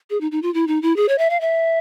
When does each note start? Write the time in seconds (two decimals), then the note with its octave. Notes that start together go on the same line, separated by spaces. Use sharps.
0.10 G#4
0.21 D#4
0.32 D#4
0.43 F4
0.54 E4
0.67 D#4
0.82 E4
0.96 G#4
1.09 C#5
1.18 E5
1.30 F5
1.41 E5